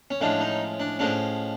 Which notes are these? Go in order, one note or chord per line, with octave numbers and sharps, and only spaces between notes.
C#4
A2 F3 G#3 C#4 D4
D#4
D4
A2 F3 G#3 C#4 D4